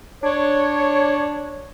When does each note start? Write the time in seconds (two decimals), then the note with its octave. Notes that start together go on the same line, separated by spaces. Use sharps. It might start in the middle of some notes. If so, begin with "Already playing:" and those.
0.24 D4 C#5